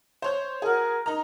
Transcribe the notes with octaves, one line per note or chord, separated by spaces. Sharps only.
C5 C#5 G6
F#4 G#4 A#4
D#4 A#5